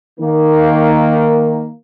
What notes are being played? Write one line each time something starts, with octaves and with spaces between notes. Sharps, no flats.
D#3 A#3